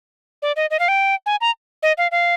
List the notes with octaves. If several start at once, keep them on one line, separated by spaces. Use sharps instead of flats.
D5
D#5
D#5
F5
G5
G#5
A#5
D#5
F5
F5